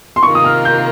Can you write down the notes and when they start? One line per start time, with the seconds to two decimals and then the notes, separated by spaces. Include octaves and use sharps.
0.16 C6
0.23 C3 D#3 A#3 F4 C#6
0.35 D#6
0.44 F6
0.65 G6